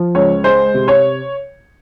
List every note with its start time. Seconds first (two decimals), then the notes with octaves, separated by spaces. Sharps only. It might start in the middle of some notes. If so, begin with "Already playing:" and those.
Already playing: F3
0.15 C#2 C#5
0.44 G#3 C5
0.74 C3
0.88 C#5